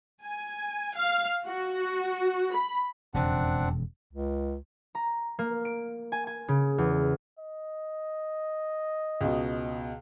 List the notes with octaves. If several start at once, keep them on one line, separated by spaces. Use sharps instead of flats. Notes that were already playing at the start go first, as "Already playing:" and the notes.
G#5
F5
F#4
B5
E1 F2 C#3 C4 D4 F#5
C#2
A#5
A#3
D7
G#5
G#5
C#3
E2
D#5
C#2 B2